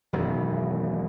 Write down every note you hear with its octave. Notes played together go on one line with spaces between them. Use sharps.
E1 F#2 B2 D#3